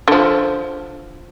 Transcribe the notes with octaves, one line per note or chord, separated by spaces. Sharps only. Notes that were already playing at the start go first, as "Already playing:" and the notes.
D3 F3